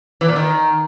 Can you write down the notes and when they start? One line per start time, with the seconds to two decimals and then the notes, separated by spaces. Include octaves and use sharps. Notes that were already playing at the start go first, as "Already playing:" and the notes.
0.21 E3
0.28 A#2
0.36 D#3